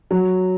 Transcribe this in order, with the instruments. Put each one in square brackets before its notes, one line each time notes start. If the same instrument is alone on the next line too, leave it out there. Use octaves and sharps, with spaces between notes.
[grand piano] F#3